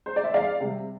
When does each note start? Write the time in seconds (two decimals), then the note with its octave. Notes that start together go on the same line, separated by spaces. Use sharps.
0.06 C5
0.16 D5
0.24 E5
0.34 E2 D5 F5
0.60 C3 G3